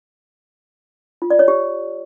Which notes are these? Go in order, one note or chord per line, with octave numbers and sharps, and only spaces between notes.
F4
D5
C#5
G4